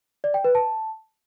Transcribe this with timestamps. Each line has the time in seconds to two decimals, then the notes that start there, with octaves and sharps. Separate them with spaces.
0.24 D5
0.34 G5
0.44 B4
0.55 A5